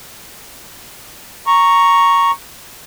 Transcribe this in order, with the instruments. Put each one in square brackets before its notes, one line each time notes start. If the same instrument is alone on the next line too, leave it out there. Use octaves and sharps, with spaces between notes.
[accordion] A#5 C#6